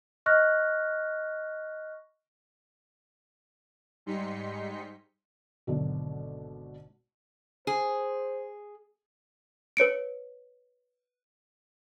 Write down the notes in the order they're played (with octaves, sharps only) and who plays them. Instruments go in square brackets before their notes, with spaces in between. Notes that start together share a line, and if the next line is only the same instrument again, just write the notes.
[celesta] D#5 C#6 F6 F#6 A#6
[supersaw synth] G#2 G3 D#4 C6 B6 C#7
[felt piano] G#1 B2 D3 F#3
[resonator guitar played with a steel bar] G#4 [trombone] C5
[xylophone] B4 C#5 C#7 D7